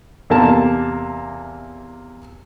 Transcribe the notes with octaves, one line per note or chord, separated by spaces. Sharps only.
E2 C3 A#3 A#4 A5